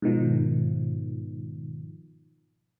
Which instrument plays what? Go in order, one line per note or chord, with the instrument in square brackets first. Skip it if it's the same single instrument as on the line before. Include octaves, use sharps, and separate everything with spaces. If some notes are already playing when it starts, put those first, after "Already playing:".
[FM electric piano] G#2 B2 D#3 F3